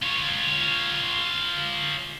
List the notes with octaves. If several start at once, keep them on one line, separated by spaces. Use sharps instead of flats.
F4 C#5